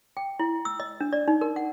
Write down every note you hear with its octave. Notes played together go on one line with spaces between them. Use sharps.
G5
E4
E6
D#5
D4
D5
D#4
A#4
F#5